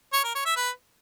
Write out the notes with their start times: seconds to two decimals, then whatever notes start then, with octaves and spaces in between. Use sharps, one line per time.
0.13 C#5
0.24 A#4
0.35 C#5
0.46 E5
0.56 B4